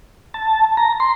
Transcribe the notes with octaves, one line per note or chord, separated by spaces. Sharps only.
A5
A#5
C6